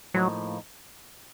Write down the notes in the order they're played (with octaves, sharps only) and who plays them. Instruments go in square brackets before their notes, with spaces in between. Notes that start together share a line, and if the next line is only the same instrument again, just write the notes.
[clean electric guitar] A2 F3 A#3 D#4 [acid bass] F#3